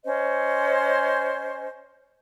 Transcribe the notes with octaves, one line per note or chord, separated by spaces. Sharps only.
C#4 C5 D#5